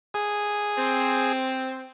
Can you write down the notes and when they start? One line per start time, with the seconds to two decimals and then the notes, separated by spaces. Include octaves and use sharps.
0.14 G#4
0.78 C4